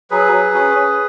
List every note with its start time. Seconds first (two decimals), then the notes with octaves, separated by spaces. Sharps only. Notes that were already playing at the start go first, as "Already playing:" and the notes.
0.11 F#3 G#4 B4
0.32 F#3
0.54 C#4
0.75 C#4